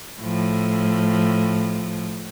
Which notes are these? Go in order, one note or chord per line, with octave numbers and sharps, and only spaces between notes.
A2 F3